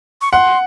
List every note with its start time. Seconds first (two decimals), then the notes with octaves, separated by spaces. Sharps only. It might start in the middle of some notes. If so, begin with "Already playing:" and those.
0.22 C#6
0.32 F#5 C6